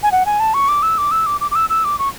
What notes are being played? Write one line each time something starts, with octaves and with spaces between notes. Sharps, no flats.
G#5
F#5
G#5
A5
C#6
D6
E6
D6
E6
D6
D6
D6
E6
E6
D6
C#6